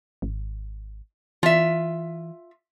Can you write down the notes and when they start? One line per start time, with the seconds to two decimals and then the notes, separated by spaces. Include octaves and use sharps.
0.22 G#1
1.43 E3 F4 E5